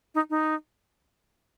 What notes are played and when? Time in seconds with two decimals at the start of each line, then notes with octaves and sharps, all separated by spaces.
0.15 D#4
0.30 D#4